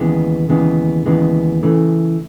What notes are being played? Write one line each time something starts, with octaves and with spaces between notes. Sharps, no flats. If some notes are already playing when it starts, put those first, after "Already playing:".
Already playing: D#2 C#3 E3 G#3 B3
D#2 C#3 E3 G#3 B3
D#2 C#3 E3 G#3 B3
C#3 E3 A3